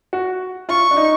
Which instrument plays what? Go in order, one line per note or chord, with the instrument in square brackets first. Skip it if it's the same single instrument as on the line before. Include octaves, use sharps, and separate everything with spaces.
[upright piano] F#4
[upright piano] F4 [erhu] C#6
[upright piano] D4
D#4